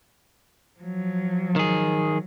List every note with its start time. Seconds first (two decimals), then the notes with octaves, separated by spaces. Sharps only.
0.80 F3 F#3
1.56 D#3 G#4